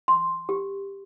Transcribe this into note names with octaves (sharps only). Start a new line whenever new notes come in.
C6
G4